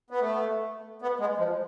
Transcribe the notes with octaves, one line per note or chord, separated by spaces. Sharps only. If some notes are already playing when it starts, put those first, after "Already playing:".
B3
A3
B3
G#3
F3